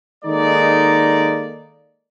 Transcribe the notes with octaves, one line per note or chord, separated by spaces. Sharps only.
D#3 G#3 A#3 D#4 A4 D5